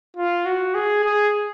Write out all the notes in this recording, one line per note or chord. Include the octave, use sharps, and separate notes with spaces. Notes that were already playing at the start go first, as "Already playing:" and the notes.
F4
F#4
G#4
G#4